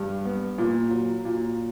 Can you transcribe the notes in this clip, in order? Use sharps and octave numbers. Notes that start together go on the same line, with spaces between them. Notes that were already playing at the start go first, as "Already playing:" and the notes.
Already playing: G2
B3
A#2
F#3
A#2